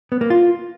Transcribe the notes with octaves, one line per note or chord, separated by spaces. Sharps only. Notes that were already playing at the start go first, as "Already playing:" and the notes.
B3
A#3
F4